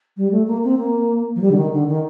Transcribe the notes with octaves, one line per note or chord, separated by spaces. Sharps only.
G3
A3
A#3
C4
A#3
F3
G3
D3
D#3
D3
D#3